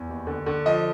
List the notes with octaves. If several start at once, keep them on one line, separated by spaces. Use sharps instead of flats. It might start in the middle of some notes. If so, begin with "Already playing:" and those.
Already playing: E2
D#2
D3
D3
F3 D#5